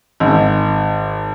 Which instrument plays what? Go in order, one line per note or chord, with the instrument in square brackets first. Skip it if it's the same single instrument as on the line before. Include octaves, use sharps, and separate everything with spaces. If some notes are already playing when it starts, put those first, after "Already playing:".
[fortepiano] G#1